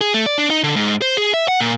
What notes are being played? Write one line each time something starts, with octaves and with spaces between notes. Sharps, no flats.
G#4
A3
D5
D4
D#4
D3
G#2
C5
G#4
E5
F#5
A#2